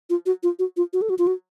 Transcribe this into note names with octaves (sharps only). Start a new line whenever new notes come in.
F4
F#4
F4
F#4
F4
F#4
A4
F#4
F4
F#4